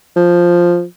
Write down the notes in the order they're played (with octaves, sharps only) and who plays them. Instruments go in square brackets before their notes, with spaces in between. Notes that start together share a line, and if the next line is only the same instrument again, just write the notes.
[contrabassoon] F3